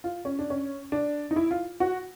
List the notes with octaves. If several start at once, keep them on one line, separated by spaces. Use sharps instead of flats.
F4
C#4
D4
C#4
D4
D#4
E4
F4
F#4